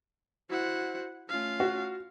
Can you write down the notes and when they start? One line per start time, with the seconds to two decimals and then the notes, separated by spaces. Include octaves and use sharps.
0.50 E4 F#4 C5 F#5
1.29 A3 C#4 F4 F5
1.60 F#4